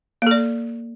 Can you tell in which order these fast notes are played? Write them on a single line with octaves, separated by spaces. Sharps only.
A#3 A4 D5